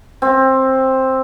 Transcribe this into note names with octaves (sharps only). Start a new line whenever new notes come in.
C4